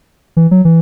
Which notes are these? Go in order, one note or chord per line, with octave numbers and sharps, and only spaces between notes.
E3
F#3
E3